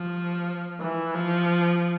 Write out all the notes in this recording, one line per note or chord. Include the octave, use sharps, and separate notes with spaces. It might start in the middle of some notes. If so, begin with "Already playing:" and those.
Already playing: F3
E3
F3